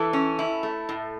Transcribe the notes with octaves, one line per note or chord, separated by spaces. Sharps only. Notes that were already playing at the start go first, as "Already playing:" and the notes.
Already playing: E3 A4
C#4
E4
A3
A2